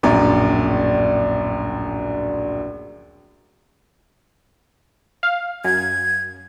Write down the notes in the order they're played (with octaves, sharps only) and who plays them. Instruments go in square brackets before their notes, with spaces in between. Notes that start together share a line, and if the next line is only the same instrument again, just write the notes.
[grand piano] D1 A#1 F#2 D5
[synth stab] F5
[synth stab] F#2 [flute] G#6